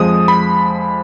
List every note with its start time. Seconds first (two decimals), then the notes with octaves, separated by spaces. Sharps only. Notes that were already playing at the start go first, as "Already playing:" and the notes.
Already playing: F2 F3 G#3 D#6
0.28 B5